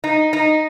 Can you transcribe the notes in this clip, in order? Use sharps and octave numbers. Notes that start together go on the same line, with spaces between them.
D#4
D#4